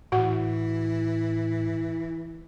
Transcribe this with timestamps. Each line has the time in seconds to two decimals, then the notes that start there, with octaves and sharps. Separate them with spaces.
0.12 A2 E3 F#4 F#5